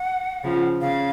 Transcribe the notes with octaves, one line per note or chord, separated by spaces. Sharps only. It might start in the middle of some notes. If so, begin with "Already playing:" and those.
Already playing: F#5
C#3 F3
C#3 F5